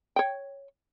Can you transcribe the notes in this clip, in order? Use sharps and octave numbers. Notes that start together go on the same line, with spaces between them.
C#5 G5